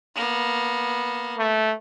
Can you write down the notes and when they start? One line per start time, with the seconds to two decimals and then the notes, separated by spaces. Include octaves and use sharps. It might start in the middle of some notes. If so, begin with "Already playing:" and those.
0.15 A#3 B3
1.38 A3